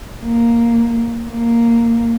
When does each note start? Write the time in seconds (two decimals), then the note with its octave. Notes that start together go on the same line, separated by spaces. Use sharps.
0.23 A#3
1.29 A#3